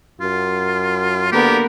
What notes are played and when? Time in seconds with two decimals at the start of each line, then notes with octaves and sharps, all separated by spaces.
0.21 F#2 F4
1.32 D3 A#3 B3 G4 A#4